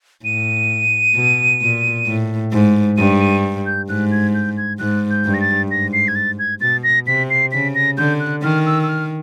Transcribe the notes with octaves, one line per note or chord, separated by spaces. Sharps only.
A2 D#7
B2
A#2
A2
G#2
G2 D#7
D#7
G6
G#2 F#6
G#6
G6
G#6
G#2 F#6
G6
G2
A#6
A6
G#2 A#6
C7
G#6
A6
G#6
B2 A6
A#6
C3 B6
C7
C#3 B6
A#6
D3 G6
F#6
D#3 F6
E6
E6
F6